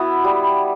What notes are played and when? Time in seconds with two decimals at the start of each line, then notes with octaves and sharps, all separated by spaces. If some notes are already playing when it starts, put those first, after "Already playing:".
Already playing: B3 E4 F#4
0.24 G3